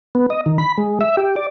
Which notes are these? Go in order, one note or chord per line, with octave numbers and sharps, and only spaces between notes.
B3
D#5
D#3
B5
G#3
E5
G4
D5